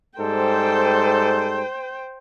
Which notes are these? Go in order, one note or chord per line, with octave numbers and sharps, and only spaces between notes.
G#2 G3 A4 C5 G5